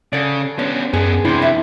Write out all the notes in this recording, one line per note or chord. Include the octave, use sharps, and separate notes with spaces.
C#3 A4 D5
B3 C#4 D4
F#2 B3 D4 G#4
C3 E3 D4 E4 C5
F2 E5